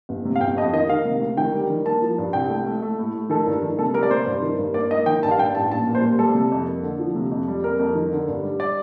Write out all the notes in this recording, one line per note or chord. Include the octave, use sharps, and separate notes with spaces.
G1
C3
F5
G1 G5
F2 D#5
D#3 D#5
D#3 F5
C3
D2
D#3 G5
G3
D#3
A#3 A5
F3
G2
C2 G5
A3
A3
A3
A2
A2
D#3 A4
G2
D#3
C3 A4
G3 A#4
D5
C3 C5
G2
D#3
G2
A#3 D5
A#3 D#5
D#3 G5
G2 A5
F5
G2 G5
A1 A5
A#1 A5
A#2
C5
G3
G3 A4
C3
F2
A#3
D3
F3
C3
F2
G3
F2 A#4
F2
D#3
D3
G2
G3
D5